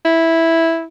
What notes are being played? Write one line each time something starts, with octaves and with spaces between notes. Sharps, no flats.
E4